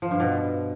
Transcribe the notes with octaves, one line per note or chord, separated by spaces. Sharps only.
F3
G2
B2